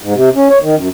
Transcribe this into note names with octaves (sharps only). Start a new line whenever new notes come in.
G#2
C3
C#4
C#5
D#3
F#2